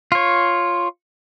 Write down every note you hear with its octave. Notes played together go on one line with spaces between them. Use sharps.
F4 C#5